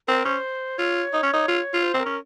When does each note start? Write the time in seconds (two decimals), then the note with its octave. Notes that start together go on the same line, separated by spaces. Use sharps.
0.07 C4 A#4
0.25 C#4 C5
0.78 F4 C#5
1.13 D#4
1.23 C#4
1.33 D#4
1.48 F4
1.73 F4
1.83 C5
1.94 C4
2.00 A#4
2.06 C#4